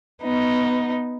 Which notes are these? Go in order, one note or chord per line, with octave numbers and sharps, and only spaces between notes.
B3 D#4